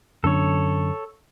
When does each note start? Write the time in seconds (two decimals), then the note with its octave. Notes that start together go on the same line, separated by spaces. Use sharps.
0.24 F#2 D3 A4 C#5